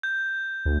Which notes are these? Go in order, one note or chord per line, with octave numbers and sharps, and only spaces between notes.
G6
D2